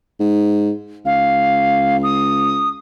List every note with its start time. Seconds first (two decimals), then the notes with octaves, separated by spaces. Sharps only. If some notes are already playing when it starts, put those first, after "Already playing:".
0.20 G#2
1.05 C#2 F5
2.03 D#6